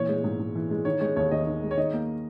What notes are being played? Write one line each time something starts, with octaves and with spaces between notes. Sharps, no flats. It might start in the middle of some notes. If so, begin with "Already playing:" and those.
Already playing: A#2 E3 C#5
G#3
G#2
G#2
E3
G#3
D#3 C#5
G#3 C#5
D#2 C#5
D#2 D#5
D#3
G#3
C#5
D#3 D#5
A#3